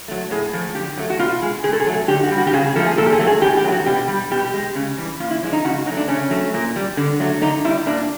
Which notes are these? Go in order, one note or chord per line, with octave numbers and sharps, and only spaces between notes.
F#3 A3
A2 G#4
F3 A3
D3 G4
F#3 A3
F#4
B2 F4
G#3 G#4
B2 G#4
A4
G#4
F#3 A3
D3 G4
F#4
G3
F#4
G4
C#3 G#4
G#4
F3 A3 A4
G#4
A#2 A4
G4
G#4
F#3 A3
G#4
A2 G4
G4
F#3 A3
F#4
B2 G4
G3
B2 G4
G#3
C#3
E3 G3
A#2 F4
E4
F3 G#3 D4
D#4
C#3 F#4
F#3 D#4
A3
D4
C#3 C#4
F#3 A3
A#2
G3
D3
F#3 A3
D3 D#4
G3 E4
A#2 D4